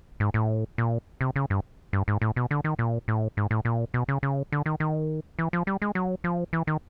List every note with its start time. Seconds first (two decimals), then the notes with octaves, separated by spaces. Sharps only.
0.20 G#2
0.34 A2
0.78 A#2
1.21 C3
1.36 C#3
1.50 G2
1.93 G2
2.08 G#2
2.22 A2
2.36 B2
2.51 D3
2.64 D#3
2.79 A#2
3.08 A2
3.37 G#2
3.51 A2
3.65 A#2
3.94 B2
4.08 C#3
4.23 C#3
4.52 D3
4.66 D#3
4.80 D#3
5.39 E3
5.53 F3
5.67 G3
5.82 G#3
5.95 F#3
6.24 F3
6.53 E3
6.67 D#3